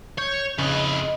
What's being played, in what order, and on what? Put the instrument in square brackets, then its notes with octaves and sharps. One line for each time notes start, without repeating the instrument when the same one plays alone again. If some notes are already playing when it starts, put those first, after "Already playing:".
[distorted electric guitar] C#5 [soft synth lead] G6
[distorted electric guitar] F2 B4 [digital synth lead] C#3 [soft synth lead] D#5